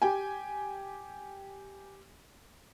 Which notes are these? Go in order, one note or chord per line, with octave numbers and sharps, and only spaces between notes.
G4 G5 G#5